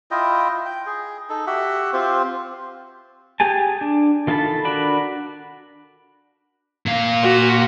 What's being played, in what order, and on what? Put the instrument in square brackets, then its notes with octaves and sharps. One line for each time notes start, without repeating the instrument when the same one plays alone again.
[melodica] E4 F4 D#5 G5
G5
G#4
D#4 A4
F#4 G4 E5 F#5
C4 F4 G4 C5
[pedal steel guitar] G4 G#4 G#5 A5
D4
D#3 F4 A4 A5 B5
D4 F#4 A#4 D5 B5
[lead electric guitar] A#2 F5
[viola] F#4